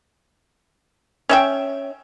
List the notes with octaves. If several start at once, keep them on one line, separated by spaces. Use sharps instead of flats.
C#4 E5 G5